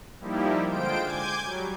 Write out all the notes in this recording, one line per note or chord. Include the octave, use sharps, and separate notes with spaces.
F3 G3 A#3 D#4 E4 G4
D3 G#3 F4 C5 G5 D7
G#5 D6 G6 G#6
F#3 G3